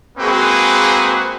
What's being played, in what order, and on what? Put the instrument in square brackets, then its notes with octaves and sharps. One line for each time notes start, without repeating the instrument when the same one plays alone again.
[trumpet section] G#3 A#3 C4 F#4 G#4 B4